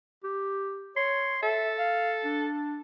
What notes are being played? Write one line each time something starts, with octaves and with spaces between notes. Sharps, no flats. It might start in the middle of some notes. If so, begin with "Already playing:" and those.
G4
C#5 C6
A4 E5
F5
D4